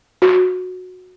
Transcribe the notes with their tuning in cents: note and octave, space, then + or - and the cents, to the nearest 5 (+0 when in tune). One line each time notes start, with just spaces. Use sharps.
F#4 -15